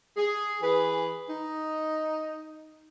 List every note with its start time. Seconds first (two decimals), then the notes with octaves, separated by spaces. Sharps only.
0.16 G#4
0.62 E3 G#4 B4
1.29 D#4